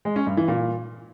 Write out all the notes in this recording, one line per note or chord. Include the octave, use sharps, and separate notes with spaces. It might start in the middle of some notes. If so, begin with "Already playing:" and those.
G#3
C#4
G2
E3
A#2